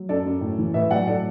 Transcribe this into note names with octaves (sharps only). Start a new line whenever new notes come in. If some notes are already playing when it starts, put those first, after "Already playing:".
Already playing: F#3
F#2 A4 D5
F#2
A2
E3
A2 B4 E5
F#3 D5 F#5
A2 A4 D5